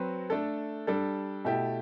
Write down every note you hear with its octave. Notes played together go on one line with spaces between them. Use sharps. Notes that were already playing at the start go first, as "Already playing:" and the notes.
Already playing: F#3 C4 F#4 B4
A3 D4 A4
G3 D4 A4
B2 A3 E4 G4